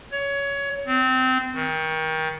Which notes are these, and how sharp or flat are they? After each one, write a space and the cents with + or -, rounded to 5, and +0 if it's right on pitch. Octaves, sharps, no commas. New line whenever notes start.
C#5 +20
C4 -20
D#3 +30